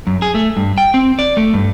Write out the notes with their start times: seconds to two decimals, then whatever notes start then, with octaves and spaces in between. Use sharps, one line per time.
0.07 F#2
0.22 G#4
0.35 A3
0.57 G2
0.78 G5
0.94 C4
1.19 D5
1.37 A3
1.54 G2